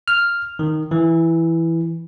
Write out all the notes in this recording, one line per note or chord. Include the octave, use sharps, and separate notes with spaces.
F6
D#3
E3